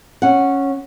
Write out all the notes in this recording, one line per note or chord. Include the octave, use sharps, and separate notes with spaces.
C#4 F#5